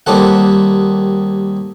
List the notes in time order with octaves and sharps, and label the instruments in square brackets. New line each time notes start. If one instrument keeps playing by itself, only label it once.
[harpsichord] D#2 G3 C4 A4 F#5